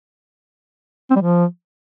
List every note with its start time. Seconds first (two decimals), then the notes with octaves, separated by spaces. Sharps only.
1.10 C4
1.16 G3
1.21 F3